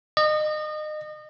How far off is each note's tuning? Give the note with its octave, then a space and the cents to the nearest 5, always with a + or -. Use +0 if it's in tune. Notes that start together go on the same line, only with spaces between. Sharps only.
D#5 -30